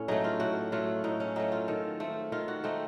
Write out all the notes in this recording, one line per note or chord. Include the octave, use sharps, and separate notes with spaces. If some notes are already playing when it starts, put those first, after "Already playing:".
Already playing: A2 C#4
F#3 A3 D#4
F4
A2 F#4
F#3 A3 F4
A2 D#4
C#4
F#3 A3 D#4
F4
D#3 A4
A3 C4
D#3 F4
F#4
A3 C4 D#4